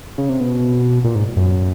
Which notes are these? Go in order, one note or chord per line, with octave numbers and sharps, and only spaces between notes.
C#3
C3
B2
A#2
G#2
F#2